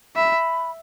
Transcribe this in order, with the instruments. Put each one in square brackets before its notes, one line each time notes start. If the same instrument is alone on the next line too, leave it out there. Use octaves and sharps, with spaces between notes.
[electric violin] E5 [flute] B5